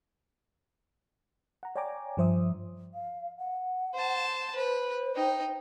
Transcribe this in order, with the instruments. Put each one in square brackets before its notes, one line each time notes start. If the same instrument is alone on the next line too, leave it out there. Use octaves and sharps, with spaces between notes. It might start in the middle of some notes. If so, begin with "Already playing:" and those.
[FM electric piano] F#5 A#5
C#5 D5 G5 G#5 A#5 D6
G2 F3 C5 E5 D#6
[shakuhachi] F5
F#5
[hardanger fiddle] C5 A5
[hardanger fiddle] B4 [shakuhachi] C5
[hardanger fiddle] D#4 G5